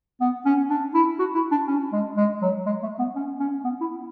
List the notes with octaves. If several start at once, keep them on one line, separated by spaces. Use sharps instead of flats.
B3
C#4
D4
E4
F#4
E4
D4
C#4
G#3
G#3
F#3
G#3
A3
B3
C#4
C#4
B3
E4